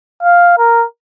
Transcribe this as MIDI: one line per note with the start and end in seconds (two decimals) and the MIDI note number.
0.23 0.58 77
0.58 0.85 70